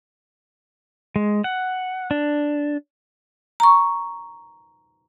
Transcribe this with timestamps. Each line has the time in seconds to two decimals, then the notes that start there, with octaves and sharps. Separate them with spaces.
1.16 G#3
1.44 F#5
2.11 D4
3.60 A#5 C#6